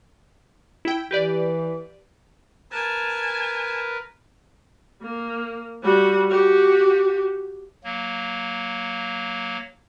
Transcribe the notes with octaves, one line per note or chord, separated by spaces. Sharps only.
E4 G5
E3 G4 B4 D5
A#4 B4 G#5 A5
A#3
G3 F#4
F#4 G4
F#3 A#3